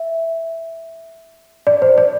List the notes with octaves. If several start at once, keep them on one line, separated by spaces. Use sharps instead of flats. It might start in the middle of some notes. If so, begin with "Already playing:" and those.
Already playing: E5
D5
C5
D5